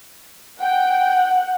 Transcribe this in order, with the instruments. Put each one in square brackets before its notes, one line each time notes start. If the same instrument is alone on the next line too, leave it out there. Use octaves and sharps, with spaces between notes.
[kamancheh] F#5 [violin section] G5